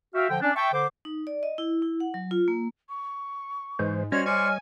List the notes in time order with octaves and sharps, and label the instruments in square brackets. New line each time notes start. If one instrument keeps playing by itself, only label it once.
[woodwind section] F#4 E5 F5 G5
D3 F3 G5
C#4 D4
E5 G5 A5 C#6
D3 C5 D6
[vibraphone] D#4
D5
D#5
E4
E4
F#5
F#3
F4
A#3
[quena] C#6
[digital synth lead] G#2 [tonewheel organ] E3 G#3 C5
[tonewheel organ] G3 C#5 D#5 [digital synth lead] C#4 [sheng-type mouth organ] F#4 C5 F6 [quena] G#6
[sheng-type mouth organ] C5 D5 C#6 [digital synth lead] G#5 [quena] F6